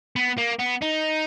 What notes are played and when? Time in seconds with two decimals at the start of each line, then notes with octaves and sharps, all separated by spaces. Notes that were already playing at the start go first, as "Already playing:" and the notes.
0.16 B3
0.38 A#3
0.59 B3
0.82 D#4